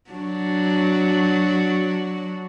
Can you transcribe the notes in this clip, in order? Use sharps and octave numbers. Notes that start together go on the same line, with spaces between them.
F#3 D4 F#4